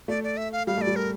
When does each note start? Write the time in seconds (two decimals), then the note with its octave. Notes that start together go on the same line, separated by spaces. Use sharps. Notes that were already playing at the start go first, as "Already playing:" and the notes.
0.08 A3 D5
0.24 D5
0.37 E5
0.52 F5
0.67 G3 F5
0.77 A3 D5
0.87 G3
0.96 A#4